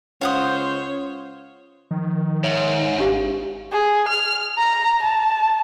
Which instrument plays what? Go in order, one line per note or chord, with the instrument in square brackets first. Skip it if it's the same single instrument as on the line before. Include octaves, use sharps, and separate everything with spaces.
[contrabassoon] C#2 [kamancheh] C5 [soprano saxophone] C#5 [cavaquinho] F5 F#5 D#6
[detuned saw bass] D#3 [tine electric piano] F3
[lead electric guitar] G#2 [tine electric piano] C#5 E5
[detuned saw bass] G#1 [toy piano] D4 G4 F5
[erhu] G#4
F6
A#5
A5